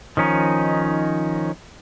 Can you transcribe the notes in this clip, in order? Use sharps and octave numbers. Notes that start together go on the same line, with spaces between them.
D#3 F3 C#4 D#4